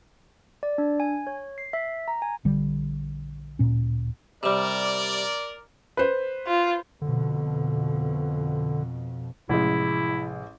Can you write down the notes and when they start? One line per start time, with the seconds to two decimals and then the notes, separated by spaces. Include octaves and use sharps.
0.63 D5
0.78 D4
1.00 G#5
1.27 C#5
1.58 C7
1.73 E5
2.08 A#5
2.22 G#5
2.45 A#1 D3 G3
3.59 D1 A#2 C#4
4.43 C3 G3 A#4 D5
5.97 B4 C5
6.47 F4
7.02 F2 B2 D3
9.49 A1 C3 F3 G#3 E4